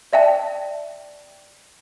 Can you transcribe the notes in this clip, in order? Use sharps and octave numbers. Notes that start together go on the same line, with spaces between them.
D5 E5 G5 A5